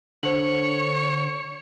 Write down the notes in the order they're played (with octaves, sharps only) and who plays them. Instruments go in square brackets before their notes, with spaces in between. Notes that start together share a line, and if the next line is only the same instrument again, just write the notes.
[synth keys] D3 [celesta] C5 F#7 [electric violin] C#5 C#7